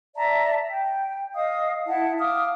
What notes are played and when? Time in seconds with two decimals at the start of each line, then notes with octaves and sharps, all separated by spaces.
0.16 D5 E5 A5 A#5
0.70 G5
1.34 D#5 F5 D#6
1.87 E4 F#5 A5
2.19 F5 D6 D#6 F6